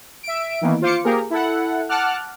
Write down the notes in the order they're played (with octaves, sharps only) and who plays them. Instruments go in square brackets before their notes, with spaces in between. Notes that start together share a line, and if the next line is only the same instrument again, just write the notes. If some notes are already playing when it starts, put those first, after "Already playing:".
[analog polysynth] E5 D7
D#3 E3 A#3 B3
F4 C5 F5 D6 C#7
A#3 G4 G#4 A#4
E4 A4 F#5
F#5 A5 D6 F6 F#6